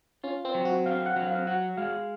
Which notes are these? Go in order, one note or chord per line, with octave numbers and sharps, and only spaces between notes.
C#4 F4
C4
F#3
F#4
C4 F5
F#5
F#3
F5
F#4 F#5
G#3 F5